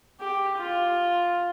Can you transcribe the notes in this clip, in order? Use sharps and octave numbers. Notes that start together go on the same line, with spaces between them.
G4
F4